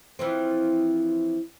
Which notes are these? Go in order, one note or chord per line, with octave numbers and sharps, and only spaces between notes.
E3 F3 C4